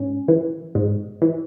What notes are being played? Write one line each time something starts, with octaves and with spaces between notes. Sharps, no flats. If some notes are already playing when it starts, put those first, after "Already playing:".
Already playing: G#2 C#4
E3
G#2
E3